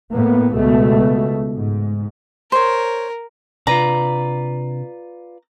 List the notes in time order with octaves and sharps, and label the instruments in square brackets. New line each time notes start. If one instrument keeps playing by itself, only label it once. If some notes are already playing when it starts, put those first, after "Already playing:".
[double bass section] A2 A#3 B3
C#2 B2 A3
G#2
[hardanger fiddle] A#4 [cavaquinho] C5 C#5
[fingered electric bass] C3 D4 [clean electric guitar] F4 B4 D5 [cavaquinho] A#5